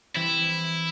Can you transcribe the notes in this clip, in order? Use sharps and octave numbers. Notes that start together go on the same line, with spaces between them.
E3 G3 C4 E4